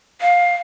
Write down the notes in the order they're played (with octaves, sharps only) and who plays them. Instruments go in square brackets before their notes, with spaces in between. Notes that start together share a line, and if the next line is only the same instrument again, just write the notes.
[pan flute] F5